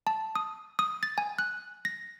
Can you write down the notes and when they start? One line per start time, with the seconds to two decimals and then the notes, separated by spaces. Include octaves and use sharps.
0.07 A5
0.35 D#6
0.79 D#6
1.03 A6
1.18 G#5
1.38 F#6
1.85 A#6